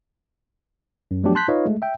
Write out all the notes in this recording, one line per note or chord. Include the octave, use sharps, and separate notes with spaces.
F#2
F3 F#3 A3 B3 D4 G4
A5 C6 F#6 G6 B6
D#4 F4 B4 C#5 D#5 F5
G#3 A3
E5 G5